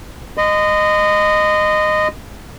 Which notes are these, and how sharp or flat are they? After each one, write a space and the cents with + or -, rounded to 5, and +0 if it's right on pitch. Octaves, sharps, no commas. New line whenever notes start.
D#5 -15 C6 -45